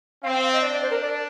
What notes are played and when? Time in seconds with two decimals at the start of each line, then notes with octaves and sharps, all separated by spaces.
0.23 C4 F5
0.33 G5
0.43 F5
0.53 D#5
0.62 D4 D5
0.72 D5
0.82 C5
0.91 A#4
1.02 D5